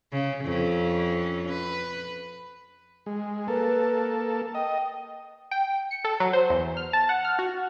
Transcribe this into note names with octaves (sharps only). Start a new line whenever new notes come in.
C#3
F2 C#4
B4
G#3
A#3 A4 B4
D#5 G5
G5
C#7
A4
F#3
C5
E2
F6
A5
F#5
F6
F#4